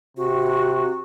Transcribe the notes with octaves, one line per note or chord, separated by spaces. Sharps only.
C3 F#4